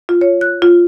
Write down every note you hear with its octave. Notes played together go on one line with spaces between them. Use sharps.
F4
C#5
F#6
F4